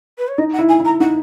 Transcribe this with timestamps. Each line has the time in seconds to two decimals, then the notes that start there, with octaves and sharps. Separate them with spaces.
0.18 B4
0.28 C#5
0.38 D#4 D#5
0.53 F#5
0.58 E4
0.69 G#5
0.80 E4
0.85 A#5
1.00 D#4 F#5